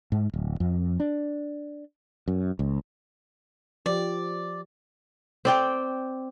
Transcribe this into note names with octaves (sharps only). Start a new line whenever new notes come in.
G#2
D1
F2
D4
F#2
C#2
F3 G4 D5
C4 D5 G5